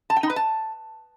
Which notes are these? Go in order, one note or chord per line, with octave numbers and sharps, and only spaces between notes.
A5
G5
D#4
B4
A5